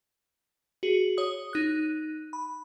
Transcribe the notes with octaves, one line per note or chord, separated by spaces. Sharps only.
F#4 G#4
C#5 D#6
D#4 F#6
B5